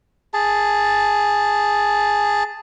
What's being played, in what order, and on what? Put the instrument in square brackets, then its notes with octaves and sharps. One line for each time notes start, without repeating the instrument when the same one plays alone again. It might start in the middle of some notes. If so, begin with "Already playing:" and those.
[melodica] G#4 A5